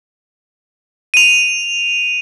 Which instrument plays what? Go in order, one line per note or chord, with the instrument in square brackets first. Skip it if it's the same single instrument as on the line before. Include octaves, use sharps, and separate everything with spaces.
[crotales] D#7 F7